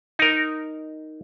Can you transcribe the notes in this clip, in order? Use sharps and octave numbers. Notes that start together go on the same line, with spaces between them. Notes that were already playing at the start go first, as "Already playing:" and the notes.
D#4 A#4